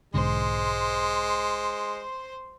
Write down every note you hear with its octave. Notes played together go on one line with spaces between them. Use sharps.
B1 G#2 D3 G#3 C5 C6